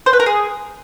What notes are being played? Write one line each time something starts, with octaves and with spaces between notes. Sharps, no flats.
C5
B4
A#4
G#4